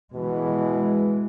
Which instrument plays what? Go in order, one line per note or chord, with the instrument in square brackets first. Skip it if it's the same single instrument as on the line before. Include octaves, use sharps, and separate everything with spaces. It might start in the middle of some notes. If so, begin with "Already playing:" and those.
[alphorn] B2 [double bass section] E3 G#3